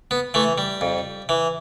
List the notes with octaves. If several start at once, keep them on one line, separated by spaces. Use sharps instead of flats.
B3
E3 A3
G3
F2
E3